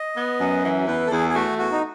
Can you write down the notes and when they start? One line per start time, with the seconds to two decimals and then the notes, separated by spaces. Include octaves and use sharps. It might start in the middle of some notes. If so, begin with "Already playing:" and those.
Already playing: D#5
0.16 B3
0.40 F#2
0.64 E3
0.87 E2 B4
1.07 A4
1.11 E2 G#4
1.29 G#4
1.34 A3 F#4
1.58 E2 F#4
1.72 D#4